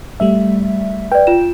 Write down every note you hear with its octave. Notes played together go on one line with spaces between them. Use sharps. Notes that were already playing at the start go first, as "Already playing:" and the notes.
G3 A3 E5
B4 D5 G5
F4 E7